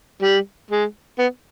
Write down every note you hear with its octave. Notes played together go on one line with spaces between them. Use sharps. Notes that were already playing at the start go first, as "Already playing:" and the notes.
G3
G#3
B3